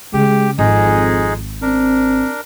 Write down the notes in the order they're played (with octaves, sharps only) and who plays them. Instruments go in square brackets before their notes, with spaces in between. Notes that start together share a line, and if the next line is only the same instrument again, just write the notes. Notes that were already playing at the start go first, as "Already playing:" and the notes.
[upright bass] C#3 [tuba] G#3 [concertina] G4
[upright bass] G#1 [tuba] F2 [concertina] G#3 D#4 G#4
[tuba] C4 [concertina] D4 A#4